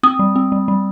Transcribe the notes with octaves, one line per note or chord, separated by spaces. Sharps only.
C4 D#6
G3
C4
G3
G3